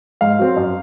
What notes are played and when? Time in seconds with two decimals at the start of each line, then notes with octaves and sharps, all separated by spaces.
0.21 G#2 F5
0.39 F#3 C4
0.56 F#2